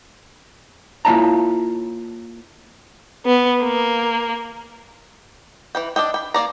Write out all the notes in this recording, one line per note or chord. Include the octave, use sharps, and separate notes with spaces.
A#3 E4 F4 C#5 A5 A#5
B3
A#3
E3 B4 G5
D4 G4 D#5 G5
G5 B5
A#3 C#4 D5 A#5